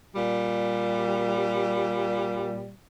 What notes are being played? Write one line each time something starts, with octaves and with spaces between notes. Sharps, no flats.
A#2 G3